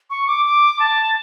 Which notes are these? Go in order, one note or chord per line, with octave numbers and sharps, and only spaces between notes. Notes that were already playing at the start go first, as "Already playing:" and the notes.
C#6
D6
D6
A5